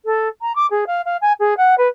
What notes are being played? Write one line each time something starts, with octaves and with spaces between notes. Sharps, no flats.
A4
A#5
D6
G#4
F5
F5
G#5
G#4
F#5
B4